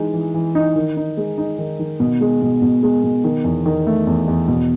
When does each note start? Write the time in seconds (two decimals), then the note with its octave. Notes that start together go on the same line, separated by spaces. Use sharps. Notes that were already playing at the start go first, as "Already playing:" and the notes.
Already playing: E3 G#3 D#4
0.14 E3
0.34 E3
0.55 D#4
0.76 D#3
0.97 D#4
1.17 G#3
1.38 D#4
1.58 D#3
1.79 D#3
2.00 B2
2.21 G#3
2.42 B2
2.62 B2
2.83 G#3
3.04 B2
3.24 D#3
3.44 E2
3.66 D#3
3.87 A3
4.07 E2
4.28 E2
4.48 B2